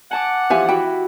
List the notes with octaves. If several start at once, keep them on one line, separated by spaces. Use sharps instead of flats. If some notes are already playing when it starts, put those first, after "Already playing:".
F#5 G#5 A5 D6
E3 F3 G4 C5 E5 G#5
E4 F#4 G5 B5